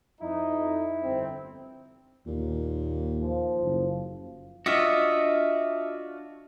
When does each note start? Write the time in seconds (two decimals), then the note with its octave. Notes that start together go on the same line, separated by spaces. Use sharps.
0.21 F2 D#4 E4
1.04 G1 C4
2.26 D#2 A#2
3.22 F3
3.61 F#1
4.66 D4 F4 F#4 D#5 E5